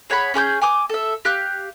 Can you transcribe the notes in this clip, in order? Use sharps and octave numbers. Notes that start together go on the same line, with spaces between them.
G#4 C#5 F#5 B5
C#4 G#4 B5 G6
G#5 D6 D#6
A4 E5
G4 F5 F#6 G6